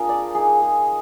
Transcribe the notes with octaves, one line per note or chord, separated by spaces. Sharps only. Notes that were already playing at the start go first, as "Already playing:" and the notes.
Already playing: A#3 D4 F4 G#4 A#4
D5
G#3 D#4 G#4
G#4